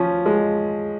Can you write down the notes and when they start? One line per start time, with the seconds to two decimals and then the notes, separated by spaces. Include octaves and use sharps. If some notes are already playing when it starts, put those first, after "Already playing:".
Already playing: F3 C#4
0.26 G#3